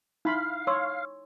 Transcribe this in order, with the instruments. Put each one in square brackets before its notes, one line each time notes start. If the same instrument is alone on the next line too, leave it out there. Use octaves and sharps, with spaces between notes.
[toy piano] D#4 [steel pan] E4 B5 C6 [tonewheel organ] F5
[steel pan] C#5 [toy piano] C6 E6